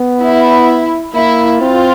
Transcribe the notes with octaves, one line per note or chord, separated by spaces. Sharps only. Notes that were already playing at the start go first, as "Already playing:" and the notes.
Already playing: B3
E4
A#3 E4
C4 F4